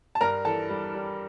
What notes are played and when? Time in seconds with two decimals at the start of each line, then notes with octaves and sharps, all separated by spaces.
0.15 A5
0.21 G2 A#4 A#5
0.45 E3 A4 A5
0.70 G3
0.95 G3